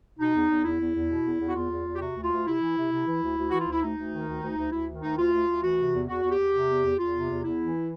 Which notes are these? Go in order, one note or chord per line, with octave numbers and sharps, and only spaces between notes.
B2 D#4
E2
E2
E2 E4
E2
E2
B2
E2
E2
F#4
E2 F4
E2
E2
G4
C3 F#4
D2
F4
D2
C3 E4
E3
C3
C3
E3
D2
D2
E3 F#4
F4
D2 E4
D2 D#4
D2
D#3
D2
D2
D2
D2 E4
D#3
D2 D#4
D2 F4
D2
D2
E3 F#4
C3
E2
E2 F#4
E2
G4
E2
C3
E2
E2
E2 F4
C3
E2
E2 E4
E3